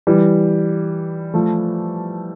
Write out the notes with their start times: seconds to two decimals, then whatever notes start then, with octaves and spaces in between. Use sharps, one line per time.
0.07 E3 G3
1.34 F3 A3